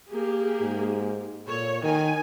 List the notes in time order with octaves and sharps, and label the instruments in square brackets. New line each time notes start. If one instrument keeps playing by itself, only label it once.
[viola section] A#3 G4 G#4
[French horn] G#2
[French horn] A#2 [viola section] A4 C#5
[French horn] D#3 [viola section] D#4 G#5